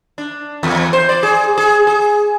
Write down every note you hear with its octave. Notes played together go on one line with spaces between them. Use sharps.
D4
E2
C5
D5
G#4
G#4
G#4